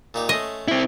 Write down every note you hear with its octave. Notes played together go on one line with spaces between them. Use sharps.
A#2 D#4 G4
A3 C#4 D#5 C6
C4 E4